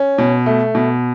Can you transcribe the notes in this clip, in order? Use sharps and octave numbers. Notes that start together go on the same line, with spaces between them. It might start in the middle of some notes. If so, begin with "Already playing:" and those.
Already playing: C#4
B2
A3
B2